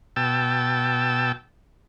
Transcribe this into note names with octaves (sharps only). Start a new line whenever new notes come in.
B2 G5 A5 E6